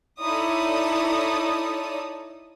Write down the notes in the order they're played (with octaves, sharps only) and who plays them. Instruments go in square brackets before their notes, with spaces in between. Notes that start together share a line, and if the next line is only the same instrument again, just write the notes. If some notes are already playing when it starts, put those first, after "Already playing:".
[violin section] D#4 E4 A4 C#5 D5 D#6